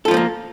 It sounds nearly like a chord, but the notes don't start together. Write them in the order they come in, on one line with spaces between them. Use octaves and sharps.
A4 F4 F3 C4 A#3